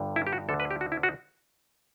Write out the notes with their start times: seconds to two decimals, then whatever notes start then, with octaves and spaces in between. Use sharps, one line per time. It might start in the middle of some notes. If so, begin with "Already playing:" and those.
Already playing: G1 G2 D3
0.16 E4
0.27 G4
0.33 F#4
0.49 D2 D3 A3 A4
0.60 B4
0.71 G4
0.81 F#4
0.92 E4
1.03 F#4